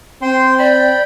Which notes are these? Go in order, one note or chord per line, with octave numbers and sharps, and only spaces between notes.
C4 C5 G5 C6
D5 G5 B5